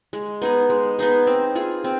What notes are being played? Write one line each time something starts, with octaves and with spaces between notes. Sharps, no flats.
G#3
B3 D#4 G#4
G#3
B3 D#4 G#4
C4
F4 G#4
C4